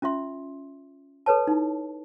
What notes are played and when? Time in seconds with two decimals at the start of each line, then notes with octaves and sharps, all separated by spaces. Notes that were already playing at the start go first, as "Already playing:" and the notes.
0.02 C#4 F4 E5 C6
1.26 A4 B4 C#5 A5
1.47 D#4 E4